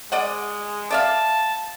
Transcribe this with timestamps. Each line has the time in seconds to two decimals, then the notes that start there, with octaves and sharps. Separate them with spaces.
0.12 G#3 D5 D#5 F#5
0.91 D5 E5 F5 A5